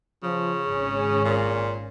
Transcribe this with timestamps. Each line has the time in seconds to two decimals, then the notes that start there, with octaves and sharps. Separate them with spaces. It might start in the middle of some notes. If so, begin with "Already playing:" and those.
0.23 C#3 F3
0.66 G#1 C#4 G#4
1.25 A#2